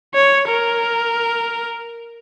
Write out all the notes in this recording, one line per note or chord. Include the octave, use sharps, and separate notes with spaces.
C#5
A#4